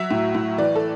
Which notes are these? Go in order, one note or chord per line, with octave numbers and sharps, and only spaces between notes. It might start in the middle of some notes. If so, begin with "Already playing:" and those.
Already playing: F#3 E5
A2
A2
E3 D5
A4